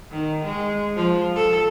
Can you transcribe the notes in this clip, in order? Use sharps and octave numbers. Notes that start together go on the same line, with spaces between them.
D#3
G#3
F3
A4